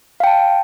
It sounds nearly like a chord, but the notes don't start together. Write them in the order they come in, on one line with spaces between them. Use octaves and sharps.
F5 G5 A5